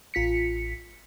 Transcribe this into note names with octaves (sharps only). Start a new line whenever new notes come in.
A1 F4 B6 C#7